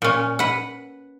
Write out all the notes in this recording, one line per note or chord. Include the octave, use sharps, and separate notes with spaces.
A#2 C#4
B4 F#5